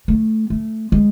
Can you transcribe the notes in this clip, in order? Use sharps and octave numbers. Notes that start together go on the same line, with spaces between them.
A3
A3
G#3